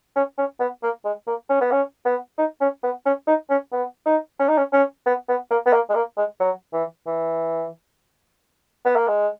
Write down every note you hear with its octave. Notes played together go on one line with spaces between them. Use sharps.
C#4
C#4
B3
A#3
G#3
A#3
C#4
B3
C#4
B3
D#4
C#4
B3
C#4
D#4
C#4
B3
D#4
C#4
D#4
C#4
C#4
B3
B3
A#3
B3
A#3
G#3
A#3
G#3
F#3
E3
E3
B3
A#3
G#3